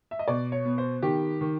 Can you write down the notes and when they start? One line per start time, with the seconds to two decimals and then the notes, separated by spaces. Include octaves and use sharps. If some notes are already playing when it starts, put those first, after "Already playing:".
0.11 E5
0.19 D#5
0.28 B2 D5
0.52 C#5
0.65 B3
0.78 C5
1.03 D#3 G4
1.41 D#3